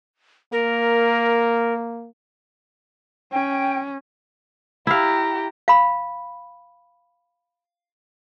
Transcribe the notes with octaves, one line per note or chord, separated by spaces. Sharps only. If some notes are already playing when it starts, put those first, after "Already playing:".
A#3 A#4
C#4 G5
E4 G4 F5 A#5
F5 B5